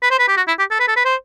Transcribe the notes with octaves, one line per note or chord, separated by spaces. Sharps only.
B4
C5
B4
G4
F#4
E4
G4
A4
B4
A4
B4
C5